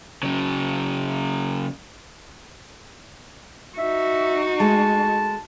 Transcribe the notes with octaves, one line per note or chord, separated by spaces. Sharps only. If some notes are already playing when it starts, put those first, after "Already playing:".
C#3 F#3
D#4 F#4 E5
G#3 A3 A5